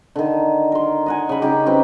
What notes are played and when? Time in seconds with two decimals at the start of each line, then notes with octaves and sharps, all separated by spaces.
0.16 D3 D#3
0.72 A#4 C6
1.06 D#5 F#5 G#5
1.29 C#3 B5
1.42 C#3 D#4 G4
1.66 C4 G4 B4